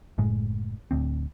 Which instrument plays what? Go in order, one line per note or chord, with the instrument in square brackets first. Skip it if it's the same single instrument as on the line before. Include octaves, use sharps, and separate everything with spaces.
[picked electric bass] F#1 A2 G#3
D1 D2 C4